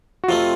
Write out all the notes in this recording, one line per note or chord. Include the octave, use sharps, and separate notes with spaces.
F#4
F2 C3 F3 A3 F4